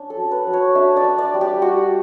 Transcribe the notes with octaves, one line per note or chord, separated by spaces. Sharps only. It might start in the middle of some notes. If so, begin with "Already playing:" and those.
Already playing: C#4 D4
A4
F#3
B4
F#3
C#5
D4 E5
D5
D4
D5
G3
G4
G3 F#4